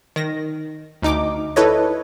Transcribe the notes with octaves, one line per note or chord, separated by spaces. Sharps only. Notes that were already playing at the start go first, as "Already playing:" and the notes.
D#3 A#6
D2 D#4 D6
E4 A4 B4 C#5 D#5